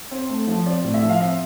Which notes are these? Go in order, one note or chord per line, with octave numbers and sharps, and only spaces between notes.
C4
A3
F3
C4 D5
A2
E5
F3
F5
C4 E5